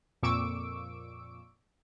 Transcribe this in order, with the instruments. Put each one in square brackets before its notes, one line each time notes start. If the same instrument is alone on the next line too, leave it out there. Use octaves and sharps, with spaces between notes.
[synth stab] F2 A#2 C#6 D6 E6 D7